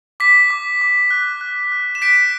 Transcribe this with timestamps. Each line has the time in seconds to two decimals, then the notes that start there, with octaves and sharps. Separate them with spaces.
0.20 D6 B6
0.50 D6
0.81 D6
1.11 F#6
1.41 F#6
1.72 F#6
1.95 E7
2.02 G6 B6 D7